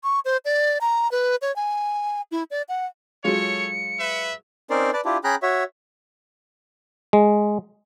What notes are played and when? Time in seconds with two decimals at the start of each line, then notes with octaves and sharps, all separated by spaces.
0.04 C#6
0.25 C5
0.45 D5
0.81 A#5
1.11 B4
1.42 C#5
1.56 G#5
2.32 E4
2.51 D5
2.69 F#5
3.24 F#3 G#3 F4 A4 C#5 C#7
4.00 B4 E5
4.70 C4 C#4 D#4 A#4 C5 D5
4.93 B4 D5 A5
5.05 D4 E4 F4 G4
5.24 C#4 G#4 G5 A#5 B5 F#6
5.42 F#4 C#5 E5
7.13 G#3